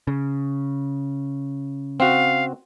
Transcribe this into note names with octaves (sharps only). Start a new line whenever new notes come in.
C#3
C4 F#4 F5